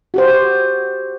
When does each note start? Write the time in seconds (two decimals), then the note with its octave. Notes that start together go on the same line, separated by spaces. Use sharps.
0.14 F#4 G4 C5